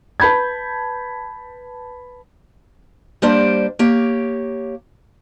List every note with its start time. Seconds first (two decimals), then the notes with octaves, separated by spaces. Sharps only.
0.20 B4 A5 B5 G6 G#6
3.22 G3 A#3 D4 G4 C5 D5
3.79 A#3 G4 C#5